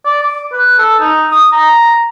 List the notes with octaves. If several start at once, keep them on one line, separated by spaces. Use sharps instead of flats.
D5
D6
B4
A4
D#4
D#6
A#5